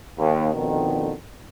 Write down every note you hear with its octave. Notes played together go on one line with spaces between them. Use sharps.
D#2
F2 B2 D3 D#3